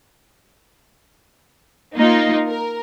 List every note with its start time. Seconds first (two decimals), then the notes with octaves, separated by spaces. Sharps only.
1.97 A#3 D#4 F4
2.47 A#4